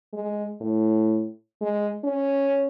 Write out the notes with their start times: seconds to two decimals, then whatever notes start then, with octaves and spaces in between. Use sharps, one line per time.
0.13 G#3
0.61 A2
1.61 G#3
2.04 C#4